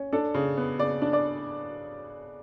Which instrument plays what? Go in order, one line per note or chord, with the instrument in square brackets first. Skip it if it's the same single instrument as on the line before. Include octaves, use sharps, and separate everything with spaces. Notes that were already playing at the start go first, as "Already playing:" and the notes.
Already playing: [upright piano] C#4
D4 A4
C#3
B3
C#3 D5
D4
D5